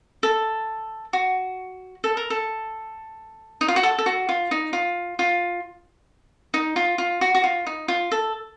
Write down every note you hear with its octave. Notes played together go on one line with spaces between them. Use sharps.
A4
F#4
A4
A#4
A4
D#4
F4
F#4
A4
A4
F#4
F4
D#4
F4
F4
D#4
F4
F4
F#4
F#4
F4
D#4
F4
A4